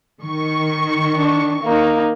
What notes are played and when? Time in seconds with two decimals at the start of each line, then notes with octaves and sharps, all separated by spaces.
0.22 D#3 C#6
1.16 D4
1.64 A#3 D#4